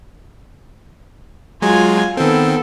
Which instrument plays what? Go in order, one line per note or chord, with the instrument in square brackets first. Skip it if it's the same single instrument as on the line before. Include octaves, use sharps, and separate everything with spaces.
[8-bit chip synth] F#3 G#3 [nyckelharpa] F4 G#5
[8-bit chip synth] D#3 C4 [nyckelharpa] B3 A4